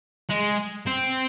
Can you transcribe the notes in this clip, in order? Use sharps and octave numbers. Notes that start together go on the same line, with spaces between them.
G#3
C4